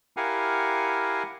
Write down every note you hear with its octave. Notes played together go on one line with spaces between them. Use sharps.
E4 G4 A#4 F5 F#5 G#5